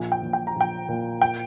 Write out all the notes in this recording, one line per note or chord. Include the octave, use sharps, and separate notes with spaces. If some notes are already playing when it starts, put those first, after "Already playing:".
Already playing: A#1
G5
A#1
G5
A#5
A#1 G5
A#2
G5